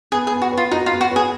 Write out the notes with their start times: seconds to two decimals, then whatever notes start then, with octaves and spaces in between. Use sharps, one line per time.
0.12 B3 G#4
0.27 G#4
0.32 B3
0.42 F#4
0.52 B4
0.57 F4
0.71 D#4 F#4
0.86 F4
0.92 B3
1.01 F#4
1.11 G#4 B4